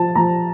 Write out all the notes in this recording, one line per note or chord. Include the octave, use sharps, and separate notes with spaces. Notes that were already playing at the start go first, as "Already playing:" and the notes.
Already playing: F3 A5
F3 A#5